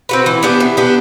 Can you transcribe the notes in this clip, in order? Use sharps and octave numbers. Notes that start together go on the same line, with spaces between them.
C4 F#4 B4
E3
B3 D4 G4
E3
B3 D4 G4